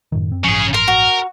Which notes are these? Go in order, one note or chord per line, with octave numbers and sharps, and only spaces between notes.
F#2 A2 D#3
F#2 C4
A1 G2 C#3 F3 G#4
A#4 C6
F#4